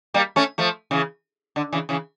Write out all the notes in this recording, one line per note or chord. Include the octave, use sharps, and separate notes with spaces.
G3 A#3
A3 C#4
F3 A3
C#3 E3
D3
C#3 E3
C#3 E3